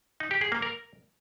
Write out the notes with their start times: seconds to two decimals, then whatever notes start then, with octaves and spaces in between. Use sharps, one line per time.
0.20 D#4
0.31 G4
0.41 G#4
0.52 A#3
0.62 A#4